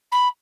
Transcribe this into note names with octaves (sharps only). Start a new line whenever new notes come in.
B5